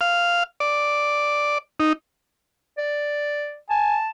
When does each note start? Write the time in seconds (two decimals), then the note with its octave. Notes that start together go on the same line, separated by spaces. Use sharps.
0.01 F5
0.60 D5
1.80 D#4
2.78 D5
3.70 G#5 A5